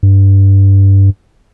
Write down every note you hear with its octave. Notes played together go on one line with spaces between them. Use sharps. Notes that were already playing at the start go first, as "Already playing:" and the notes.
G2